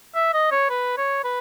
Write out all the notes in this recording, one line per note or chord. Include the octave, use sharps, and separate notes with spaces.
E5
D#5
C#5
B4
C#5
B4